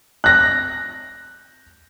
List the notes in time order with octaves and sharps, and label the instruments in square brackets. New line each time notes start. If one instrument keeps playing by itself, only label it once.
[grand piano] F#6 A#6